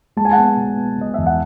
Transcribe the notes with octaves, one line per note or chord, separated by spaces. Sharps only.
G#3 A5
G#5
F#5 A5
B3
B2
B3
B2 D#5
E2 E5
F#5